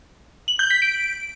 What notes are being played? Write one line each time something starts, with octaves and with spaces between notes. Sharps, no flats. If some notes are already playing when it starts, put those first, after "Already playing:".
F#7
G6
B6
D7